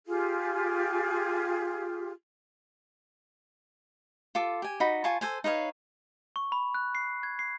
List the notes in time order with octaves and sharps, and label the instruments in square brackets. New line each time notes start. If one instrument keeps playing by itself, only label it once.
[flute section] F4 G4 G#4
[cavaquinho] F4 A4 D6
G4 G#5
D#4 F#4 B5
F4 G#5 A5 C#6
A4 C5 G#5
D#4 B4 C#5 F5
[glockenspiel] C#6
B5
F#6
C7
G#6
C7